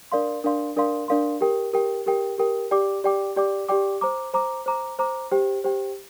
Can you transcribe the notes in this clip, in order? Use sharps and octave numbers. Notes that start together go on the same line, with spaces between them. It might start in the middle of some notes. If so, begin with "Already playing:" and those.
D4 A#4 D5 F5 C6
D4 A#4 D5 F5 C6
D4 A#4 D5 F5 C6
D4 A#4 D5 F5 C6
G4 A#4 G5
G4 A#4 G5
G4 A#4 G5
G4 A#4 G5
G4 D5 G5 D6
G4 D5 G5 D6
G4 D5 G5 D6
G4 D5 G5 D6
C5 A#5 D6
C5 A#5 D6
C5 A#5 D6
C5 A#5 D6
G4 C5 G5
G4 C5 G5